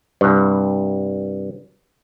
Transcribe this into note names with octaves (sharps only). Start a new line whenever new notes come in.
C2 G2